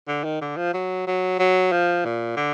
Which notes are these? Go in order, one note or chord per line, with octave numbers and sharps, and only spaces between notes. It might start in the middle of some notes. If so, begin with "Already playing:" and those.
D3
D#3
D3
F3
F#3
F#3
F#3
F3
A#2
D3